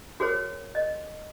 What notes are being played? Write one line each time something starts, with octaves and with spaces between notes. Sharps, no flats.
F#4 G#4 A#4 C5 C#5
D#5